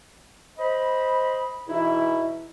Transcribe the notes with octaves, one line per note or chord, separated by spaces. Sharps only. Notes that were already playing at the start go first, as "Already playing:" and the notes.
C5 D#5 B5
E2 B2 E3 D#4 E4